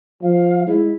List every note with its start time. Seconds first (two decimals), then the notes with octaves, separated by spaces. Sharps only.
0.23 F3 F5
0.67 G#3 E4